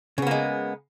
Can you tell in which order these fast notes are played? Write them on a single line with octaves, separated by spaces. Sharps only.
C#3 B3 A#3 G#3